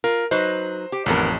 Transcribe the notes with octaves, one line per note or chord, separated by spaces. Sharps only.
F4 A#4
F#3 D#4 B4 C5
G4
A1 F2 D#3 B3 A#4